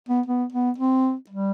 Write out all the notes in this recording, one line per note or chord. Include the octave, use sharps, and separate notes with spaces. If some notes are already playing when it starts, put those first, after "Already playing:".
B3
B3
B3
C4
G3